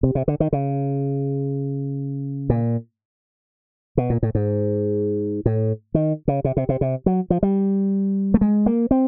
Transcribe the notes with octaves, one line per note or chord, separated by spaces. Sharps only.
C3
C3
D3
D#3
C#3
A#2
B2
A#2
A2
G#2
A2
D#3
C#3
C3
C3
C3
C3
F#3
F3
G3
A3
G#3
A#3
C4